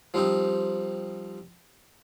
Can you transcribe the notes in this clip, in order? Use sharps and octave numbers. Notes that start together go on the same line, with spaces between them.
F3 G3 C4 D#4